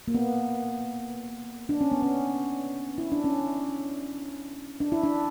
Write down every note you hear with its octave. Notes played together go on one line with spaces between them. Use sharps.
A#3
B3
D4
C#4
B3
C#4
E4
D4
C#4
D4
E4
D4